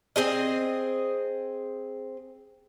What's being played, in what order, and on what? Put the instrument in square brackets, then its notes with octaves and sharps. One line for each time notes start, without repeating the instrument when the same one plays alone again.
[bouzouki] C4 G#4 D#5